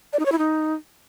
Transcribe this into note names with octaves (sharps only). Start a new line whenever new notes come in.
D5
D#4
C#5
E4
D#4